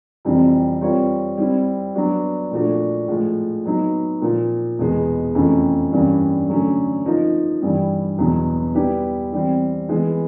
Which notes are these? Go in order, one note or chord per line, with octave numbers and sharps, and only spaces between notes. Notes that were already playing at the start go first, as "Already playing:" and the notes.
F2 C3 E3 G3 C4
G3 C4 F4 A#4 C#5
G3 C4 E4
F#3 B3 D4 F#4
A#2 F3 A3 D4 F#4
A2 F3 G#3
F#3 B3 D#4
A#2 F3 A#3
E2 B2 G#3 B3
F2 C3 E3 A3 C#4
G2 E3 G3 A#3 C#4
D3 F#3 A3 C#4
F3 A#3 D#4
G2 E3 G3
E2 B2 F#3 B3
G3 B3 E4 G4 B4
E3 G3 C4
E3 G#3 B3